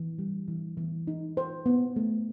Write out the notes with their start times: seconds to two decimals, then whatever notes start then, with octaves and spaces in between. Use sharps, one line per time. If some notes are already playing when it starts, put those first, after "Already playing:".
Already playing: E3
0.19 G3
0.48 E3
0.77 E3
1.07 D#4
1.37 C5
1.66 B3
1.96 A3